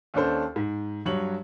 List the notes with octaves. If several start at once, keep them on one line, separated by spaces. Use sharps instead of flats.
D#2 C#4 D4 A4 C5
G#2
G2 F#3 C#5 F#7